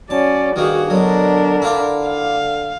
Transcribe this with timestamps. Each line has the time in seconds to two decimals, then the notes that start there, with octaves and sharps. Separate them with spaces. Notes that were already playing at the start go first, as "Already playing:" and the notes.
0.10 F#3 C#4 D5 A5
0.56 G2 D#3 A#3 F#4 G#4
0.90 B2 D3 F#3 D4 A#4
1.62 E4 F4 D5
2.07 F5